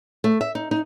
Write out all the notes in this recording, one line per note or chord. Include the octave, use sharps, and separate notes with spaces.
A3
E5
D#4
D#4